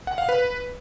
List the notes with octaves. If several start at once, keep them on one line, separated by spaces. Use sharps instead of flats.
F#5
F5
B4